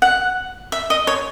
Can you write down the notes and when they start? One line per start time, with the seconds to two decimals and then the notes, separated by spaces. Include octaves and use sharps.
0.02 F#5
0.72 E5
0.90 D#5
1.07 C#5